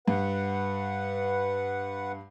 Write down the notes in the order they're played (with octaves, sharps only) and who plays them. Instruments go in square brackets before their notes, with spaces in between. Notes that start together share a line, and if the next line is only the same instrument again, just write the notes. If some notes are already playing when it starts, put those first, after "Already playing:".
[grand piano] G2 [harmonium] B4 F#5